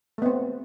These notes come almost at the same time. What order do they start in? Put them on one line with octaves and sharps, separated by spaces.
A3 B3 C4